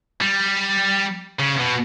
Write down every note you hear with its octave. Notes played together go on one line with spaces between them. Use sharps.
G3
C#3
B2